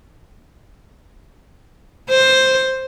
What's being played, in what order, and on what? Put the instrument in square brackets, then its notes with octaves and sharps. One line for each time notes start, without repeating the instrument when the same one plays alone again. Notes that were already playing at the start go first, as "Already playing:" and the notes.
[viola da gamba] C5